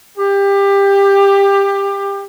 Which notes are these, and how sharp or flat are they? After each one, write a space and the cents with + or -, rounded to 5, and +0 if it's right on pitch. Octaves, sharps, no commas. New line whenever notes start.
G4 +20